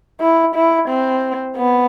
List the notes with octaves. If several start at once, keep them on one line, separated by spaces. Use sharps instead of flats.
E4
E4
C4
B3